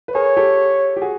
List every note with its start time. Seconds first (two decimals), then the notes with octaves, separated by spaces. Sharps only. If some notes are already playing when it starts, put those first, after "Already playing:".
0.08 B4
0.15 G#4 A#4 C#5
0.37 G4 A4
0.97 G4
1.02 F#4 G#4